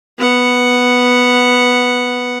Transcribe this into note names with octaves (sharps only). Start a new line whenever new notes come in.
B3 F#5